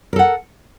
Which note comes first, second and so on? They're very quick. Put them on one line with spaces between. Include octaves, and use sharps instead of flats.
A#4 A4 F#5